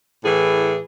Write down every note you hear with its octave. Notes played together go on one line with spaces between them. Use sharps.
A2 E3 G#4